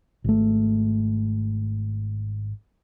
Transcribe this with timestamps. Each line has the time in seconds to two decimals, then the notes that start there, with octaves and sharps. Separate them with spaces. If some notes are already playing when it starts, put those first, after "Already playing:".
0.24 G#1 A3